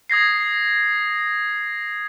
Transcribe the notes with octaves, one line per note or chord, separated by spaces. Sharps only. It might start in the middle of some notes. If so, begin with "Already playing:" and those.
D#6 G#6 A#6 C7